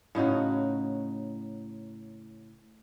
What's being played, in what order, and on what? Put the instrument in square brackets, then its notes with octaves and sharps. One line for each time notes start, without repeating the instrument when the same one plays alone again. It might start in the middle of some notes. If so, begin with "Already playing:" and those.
[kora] A2 C#3 D#4 F#4